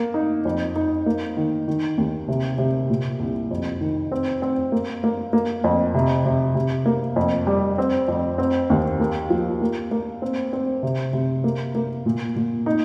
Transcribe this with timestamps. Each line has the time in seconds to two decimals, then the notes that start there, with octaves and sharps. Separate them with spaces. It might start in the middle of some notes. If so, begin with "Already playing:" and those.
Already playing: A#3
0.14 D#4
0.45 F2
0.76 D#4
1.06 A#3
1.37 D#3
1.68 D#3
1.98 D#2
2.28 C3
2.58 C3
2.90 A#2
3.19 C2
3.51 F2
3.81 D#3
4.12 C4
4.42 C4
4.72 A#3
5.04 A#3
5.33 A#3
5.64 F2
5.94 C3
6.26 C3
6.55 C3
6.86 A#3
7.16 F2
7.47 G3
7.78 C4
8.08 F2
8.38 C4
8.70 D#2
9.00 A#3
9.30 F3
9.62 A#3
9.91 A#3
10.22 C4
10.53 C4
10.83 C3
11.13 C3
11.44 A#3
11.75 A#3
12.06 A#2
12.36 A#2
12.66 D#4